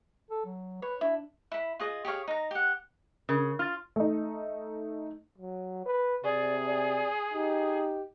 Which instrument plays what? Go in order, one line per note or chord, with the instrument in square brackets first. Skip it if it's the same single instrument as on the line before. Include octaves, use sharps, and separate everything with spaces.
[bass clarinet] A4
F#3
[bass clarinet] B4 [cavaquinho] C#5
[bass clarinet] D4 [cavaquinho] E4
[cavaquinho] E4 B5
F4 G#4 D#5
G4 G#4 C#5 F5
D#4 A#5
G4 F#5
[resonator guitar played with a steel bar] C#3 [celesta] A#4
[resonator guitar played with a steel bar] F4 [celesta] F6 A6
[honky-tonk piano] A3 D#4
[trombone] F#3
B4
[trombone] C3 [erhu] G#4 [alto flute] D5
[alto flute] D5
[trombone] D#4 [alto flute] G4